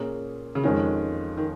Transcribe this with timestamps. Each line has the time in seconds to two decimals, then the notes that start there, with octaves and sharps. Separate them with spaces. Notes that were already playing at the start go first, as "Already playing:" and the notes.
Already playing: A#2 A#3 C#4 G#4
0.55 C#3
0.64 F2 D#3 F3 G#3 C#4 F4
1.38 D#3